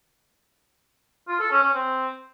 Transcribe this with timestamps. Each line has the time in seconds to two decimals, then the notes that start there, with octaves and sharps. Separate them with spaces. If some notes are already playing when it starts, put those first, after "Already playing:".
1.28 F4
1.40 A4
1.51 C#4
1.62 C#4
1.74 C4